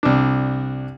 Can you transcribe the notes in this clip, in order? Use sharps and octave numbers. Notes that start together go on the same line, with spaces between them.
C2 D4